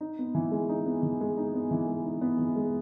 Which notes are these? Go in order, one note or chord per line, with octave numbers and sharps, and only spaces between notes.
D#4
B3
E3
G#3
D#4
B3
E3
G#3
D#4
B3
E3
G#3
D#4
B3
E3
G#3